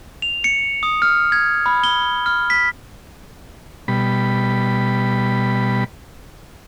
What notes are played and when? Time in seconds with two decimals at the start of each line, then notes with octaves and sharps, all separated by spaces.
0.22 F7
0.44 C#7
0.83 D#6
1.02 F6
1.32 G#6
1.66 B5
1.84 G7
2.26 F6
2.50 B6
3.88 B2 G3 B5